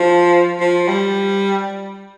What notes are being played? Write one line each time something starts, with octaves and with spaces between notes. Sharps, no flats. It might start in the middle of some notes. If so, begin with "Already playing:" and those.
Already playing: F3
F3
G3